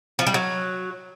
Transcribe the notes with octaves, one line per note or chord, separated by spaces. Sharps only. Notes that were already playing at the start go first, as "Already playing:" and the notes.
F3
G3
F#3